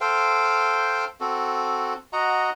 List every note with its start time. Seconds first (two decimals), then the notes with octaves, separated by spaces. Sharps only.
0.01 A4 C5 F5 G5
1.20 C4 F#4 A4
2.13 F#4 D#5 F#5 A#5